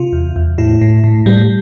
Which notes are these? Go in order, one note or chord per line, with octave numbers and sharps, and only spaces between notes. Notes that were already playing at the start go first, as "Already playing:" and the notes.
Already playing: C3 F4
E2
E2
A2 E4
A2
A2
A2 G3